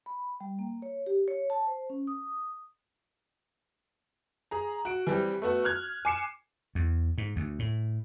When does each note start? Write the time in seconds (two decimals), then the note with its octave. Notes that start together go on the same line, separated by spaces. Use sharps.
0.06 B5
0.40 G3
0.59 A#3
0.82 C#5
1.06 G4
1.28 C#5
1.50 A5
1.67 C5
1.90 C#4
2.07 D#6
4.51 G#4 A#5
4.85 F#4 D7
5.07 E3 G3 C4
5.42 A3 B3 F#4
5.64 F6 F#6 G#6
6.05 G#5 D6 C7 C#7 E7
6.75 E2
7.18 G#2
7.36 D2
7.59 A2